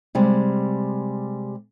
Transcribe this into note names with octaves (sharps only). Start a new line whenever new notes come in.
C3 G3 G#3